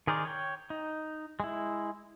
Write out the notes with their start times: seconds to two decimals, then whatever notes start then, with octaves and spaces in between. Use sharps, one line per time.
0.07 D#3 G#4 A#4 C5 D5
0.25 C#5 G5
0.70 D#4
1.40 G#3 E4